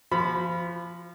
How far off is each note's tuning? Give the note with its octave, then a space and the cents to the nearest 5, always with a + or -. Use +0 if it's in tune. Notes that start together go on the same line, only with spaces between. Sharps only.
F3 -20 F#4 -45 B5 +0